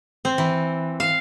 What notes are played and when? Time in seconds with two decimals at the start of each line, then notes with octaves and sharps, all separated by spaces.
0.25 C4
0.38 E3
1.00 F5